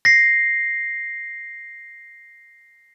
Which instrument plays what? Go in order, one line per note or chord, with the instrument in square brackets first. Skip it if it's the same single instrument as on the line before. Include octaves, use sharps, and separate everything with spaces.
[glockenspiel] A#6 C7